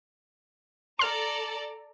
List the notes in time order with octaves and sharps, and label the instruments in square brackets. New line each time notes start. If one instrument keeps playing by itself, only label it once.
[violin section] A4 D5 A#5 [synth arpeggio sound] C6 F6